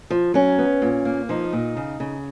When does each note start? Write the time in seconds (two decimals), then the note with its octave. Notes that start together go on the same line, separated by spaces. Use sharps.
0.10 F3
0.34 F#3 C#4
0.58 B3
0.82 A#2
1.05 A#3
1.29 F3 D#4
1.53 A#2
1.77 C#3
2.00 C#3